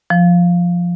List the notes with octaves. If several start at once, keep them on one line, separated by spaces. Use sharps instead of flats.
F3